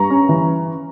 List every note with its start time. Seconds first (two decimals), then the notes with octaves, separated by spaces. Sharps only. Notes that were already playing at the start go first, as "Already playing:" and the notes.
Already playing: G2 A#5 C#6
0.10 C#4
0.29 E3